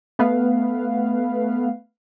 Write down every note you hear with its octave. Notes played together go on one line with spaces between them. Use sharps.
A3 B3 B4 F5